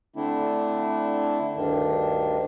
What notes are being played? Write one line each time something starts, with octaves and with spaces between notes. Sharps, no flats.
D3 A3 C4 D4 E4
D2 G2 D#3 D4